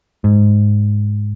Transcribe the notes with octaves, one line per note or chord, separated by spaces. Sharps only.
G#2